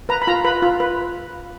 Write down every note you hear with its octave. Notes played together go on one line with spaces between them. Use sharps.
B4 A#5
B5
F4 A#5
B4 B5
F4
B4